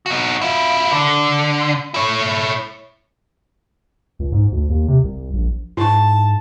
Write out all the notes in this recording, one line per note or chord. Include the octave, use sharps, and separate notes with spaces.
D#4 F#4
E4 F4
D3
E4 C#5
C#2
G#2
D2
D#2
C3
C2
A#1
G#2 E4 A5 C#6